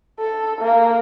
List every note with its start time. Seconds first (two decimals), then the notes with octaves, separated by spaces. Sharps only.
0.19 A4
0.61 A#3